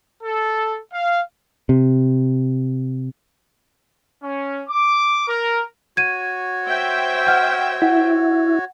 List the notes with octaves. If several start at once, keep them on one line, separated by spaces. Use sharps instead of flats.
A4
F5
C3
C#4
D6
A#4
F#4 C#5 G#6 D#7
C5 E5 G5
F#5 F6 G6
E4 F#5